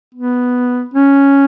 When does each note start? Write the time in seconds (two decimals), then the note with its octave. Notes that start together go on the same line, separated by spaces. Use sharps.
0.15 B3
0.94 C#4